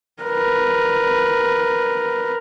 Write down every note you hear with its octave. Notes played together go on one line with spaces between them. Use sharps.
A#4 B4